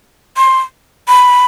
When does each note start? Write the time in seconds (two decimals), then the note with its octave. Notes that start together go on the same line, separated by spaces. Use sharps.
0.37 C6
1.08 B5